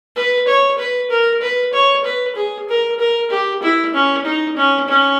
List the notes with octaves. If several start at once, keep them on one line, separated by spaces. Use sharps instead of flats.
B4
C#5
B4
A#4
B4
C#5
B4
G#4
A#4
A#4
G4
E4
C#4
D#4
C#4
C#4